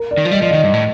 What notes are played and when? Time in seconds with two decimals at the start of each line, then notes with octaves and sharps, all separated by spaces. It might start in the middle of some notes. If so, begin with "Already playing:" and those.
Already playing: A#4
0.11 D5
0.18 D#3
0.25 F3
0.31 G3 D#5
0.41 F3 D5
0.51 D#3 D#5
0.63 G2
0.74 A2